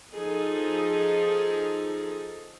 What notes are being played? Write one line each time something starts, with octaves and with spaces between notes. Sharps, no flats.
F3 D#4 G#4 A4